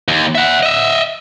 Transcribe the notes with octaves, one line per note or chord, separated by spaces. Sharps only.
D#2
E5 F#5
D#5 E5